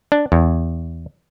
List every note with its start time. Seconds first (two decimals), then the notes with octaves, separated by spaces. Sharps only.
0.12 D4
0.32 E2